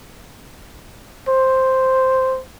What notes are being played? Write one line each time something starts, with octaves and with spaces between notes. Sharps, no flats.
C5